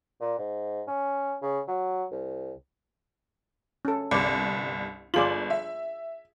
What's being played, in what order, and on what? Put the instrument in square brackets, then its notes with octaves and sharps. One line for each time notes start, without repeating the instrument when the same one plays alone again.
[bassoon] A#2
G#2
C#4
C#3
F#3
C2
[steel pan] C#4 A4
[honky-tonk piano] G1 C2 [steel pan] D5
[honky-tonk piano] G1 F#7 [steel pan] F4 G#4 D5
[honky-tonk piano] E5